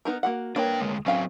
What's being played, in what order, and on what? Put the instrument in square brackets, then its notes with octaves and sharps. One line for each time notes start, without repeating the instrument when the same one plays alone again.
[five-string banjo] B3 D#4 A#4
A#3 F#4 F#5
[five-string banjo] A#3 B4 C#5 [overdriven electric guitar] D4 G5
[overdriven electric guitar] D2 G#3
[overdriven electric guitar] F#3 C4 [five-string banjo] C#4 F5 G5